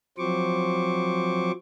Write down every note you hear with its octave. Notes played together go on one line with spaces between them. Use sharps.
F3 F#3 C4 C5 C#6 D6